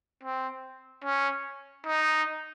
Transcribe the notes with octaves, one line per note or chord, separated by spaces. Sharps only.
C4
C#4
D#4